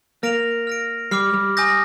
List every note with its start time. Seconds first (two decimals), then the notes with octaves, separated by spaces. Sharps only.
0.23 A#3 F6 A#6 D7 F7
0.67 F6 A#6 D7
1.11 G3 D6 F6 C7
1.33 G3
1.57 G#5 D#6 G6 A#6